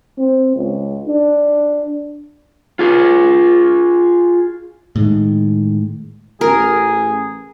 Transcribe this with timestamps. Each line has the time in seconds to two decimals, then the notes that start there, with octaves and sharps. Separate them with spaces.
0.18 C4
0.56 C#2
1.07 D4
2.79 F4 G#4
4.96 A2 D#3 G#3
6.41 A1 G#4 A#4